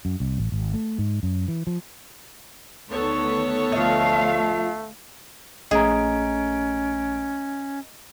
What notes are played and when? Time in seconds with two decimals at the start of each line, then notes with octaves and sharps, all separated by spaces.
0.05 F#2
0.20 C2
0.38 A1
0.52 G#1
0.74 A3
0.99 G#2
1.23 F#2
1.48 E3
1.67 F3
2.90 D2 D#3 B3 A4 C#5
3.72 D2 F3 A3 D#5 F5
5.71 A#1 A3 C#4 G#4 D#5 A#5 D7